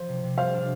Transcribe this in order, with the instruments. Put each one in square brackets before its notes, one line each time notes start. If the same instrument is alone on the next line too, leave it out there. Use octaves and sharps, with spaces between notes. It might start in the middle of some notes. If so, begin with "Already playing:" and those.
Already playing: [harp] F3 [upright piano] C5
[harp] C3
C3
[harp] G3 [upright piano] C5 F5
[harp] D4